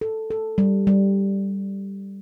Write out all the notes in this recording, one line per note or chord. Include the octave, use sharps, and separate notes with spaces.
A4
A4
G3
G3